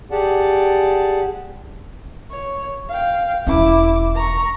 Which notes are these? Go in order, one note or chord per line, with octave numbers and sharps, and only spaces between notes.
G4 G#4 D5 F#5 A5
C#5
F5 G5
E1 C#4 E4 D6
A#5 C#6